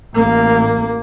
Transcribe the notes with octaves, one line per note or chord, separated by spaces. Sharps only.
A1 A#3